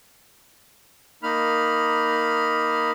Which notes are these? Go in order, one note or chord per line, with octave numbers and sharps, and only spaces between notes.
A#3 D#4 B5 F6